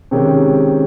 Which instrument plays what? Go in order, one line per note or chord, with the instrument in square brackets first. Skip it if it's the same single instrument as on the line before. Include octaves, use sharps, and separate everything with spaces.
[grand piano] C3 D#3 G#3 C#4 G4